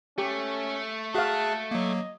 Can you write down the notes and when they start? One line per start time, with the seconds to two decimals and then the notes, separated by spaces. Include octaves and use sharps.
0.18 A3 C#4 G4
1.14 F#4 G#4 E5 F5 A5 F#6
1.71 F#3 A#3 D#5